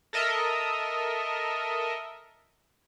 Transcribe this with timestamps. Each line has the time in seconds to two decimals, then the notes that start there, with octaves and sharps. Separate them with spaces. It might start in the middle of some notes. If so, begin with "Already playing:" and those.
0.13 A4 A#4 D#5 E5